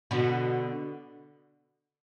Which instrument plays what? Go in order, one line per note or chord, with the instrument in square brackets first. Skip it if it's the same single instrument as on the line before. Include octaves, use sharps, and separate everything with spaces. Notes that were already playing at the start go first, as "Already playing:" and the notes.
[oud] B2 D3